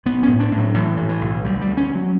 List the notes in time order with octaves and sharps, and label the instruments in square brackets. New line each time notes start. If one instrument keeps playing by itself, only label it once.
[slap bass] B1 B3
C#4
A2
D4
A2
F#3
A2 E3
A2
E3
B1
D2 G3
G3
D2
C#4
D2
F#3